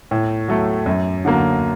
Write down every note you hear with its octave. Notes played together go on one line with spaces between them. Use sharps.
A2
F#3 A3
F#2
D3 F#3 A#3